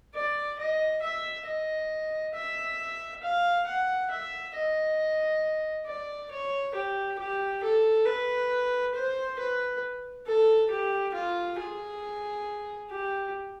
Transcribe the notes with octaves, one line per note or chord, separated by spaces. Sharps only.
D5
D#5
E5
D#5
E5
F5
F#5
E5
D#5
D5
C#5
G4
G4
A4
B4
C5
B4
A4
G4
F4
G#4
G4